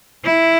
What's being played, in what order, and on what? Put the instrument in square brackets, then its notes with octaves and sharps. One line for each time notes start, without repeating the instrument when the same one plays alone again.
[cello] E4